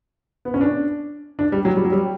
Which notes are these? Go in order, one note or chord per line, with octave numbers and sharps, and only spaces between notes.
B3
C#4
D4
D4
G3
F#3
G3
F#3
G3